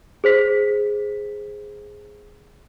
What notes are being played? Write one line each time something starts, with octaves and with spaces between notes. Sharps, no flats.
G#4 C5 B6